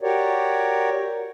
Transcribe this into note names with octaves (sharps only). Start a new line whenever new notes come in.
F#4 G4 A#4 C#5 D5